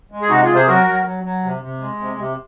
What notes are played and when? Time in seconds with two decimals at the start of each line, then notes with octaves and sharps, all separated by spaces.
0.11 G#3
0.22 G#4
0.29 C3 D#4 F#4
0.43 F4 G#4
0.50 C3
0.55 G#4 C5
0.68 F#3 F#4 A#4
0.87 F#3
1.05 F#3
1.24 F#3
1.43 C3
1.62 C3
1.80 G#3
1.99 C3
2.18 C3